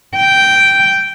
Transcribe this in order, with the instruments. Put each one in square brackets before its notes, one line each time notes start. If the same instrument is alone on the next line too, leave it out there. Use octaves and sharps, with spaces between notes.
[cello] G5